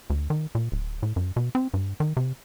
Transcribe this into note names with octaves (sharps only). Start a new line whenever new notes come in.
D2
D#3
A#2
D1
A2
F#2
B2
C4
G2
D#3
C3